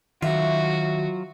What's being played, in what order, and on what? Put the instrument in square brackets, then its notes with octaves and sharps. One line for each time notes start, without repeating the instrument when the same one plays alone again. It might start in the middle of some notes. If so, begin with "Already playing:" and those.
[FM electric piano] D#3 [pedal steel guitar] F#3 F4 [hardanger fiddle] F#4 [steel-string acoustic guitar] E5